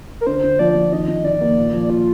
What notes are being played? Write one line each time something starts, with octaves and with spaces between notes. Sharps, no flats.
A#4
D3 C5
D3
F3 D5
F3
D#3 D#5
D#3
D#3 D5
A#3
A#2
F3
A#2 F4